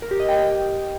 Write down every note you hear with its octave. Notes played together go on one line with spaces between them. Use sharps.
A#4
G4
D#5
G5